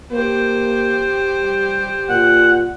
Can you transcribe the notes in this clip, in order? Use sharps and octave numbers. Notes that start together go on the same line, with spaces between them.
A#3 G4 C5
G3
A#2 F#5